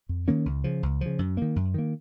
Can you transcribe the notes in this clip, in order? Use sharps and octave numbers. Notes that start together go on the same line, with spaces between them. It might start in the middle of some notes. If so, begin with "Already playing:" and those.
F2
D#3 A#3 C#4
C#2
C#3 F3
C#2
C#3 F3
F#2
D#3 A#3
F#2
D#3 A#3